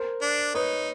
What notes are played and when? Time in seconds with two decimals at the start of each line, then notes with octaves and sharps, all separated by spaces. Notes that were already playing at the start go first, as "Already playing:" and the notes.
Already playing: A#4 C5
0.22 D4
0.54 D#4 B4 C#5